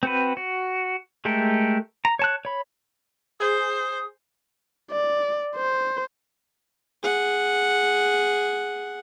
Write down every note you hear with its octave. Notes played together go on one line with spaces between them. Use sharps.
C4 F#4 B4
F#4
G#3 A3 G4 A4 A#4
A#5
C#5 A5 F#6
C#5 B5
G#4 C5 D#6
D5
C5
G#4 F#5